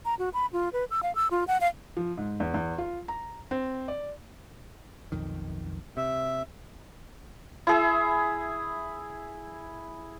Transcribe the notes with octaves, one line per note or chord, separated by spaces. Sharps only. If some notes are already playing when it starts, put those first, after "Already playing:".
A#5
F#4
B5
F4
B4
E6
F5
E6
F4
F#5
F5
F3
G#2
E2
E2
F4
A#5
C4
D5
B1 F2 D#3
C3 E5
E4 G#4 E5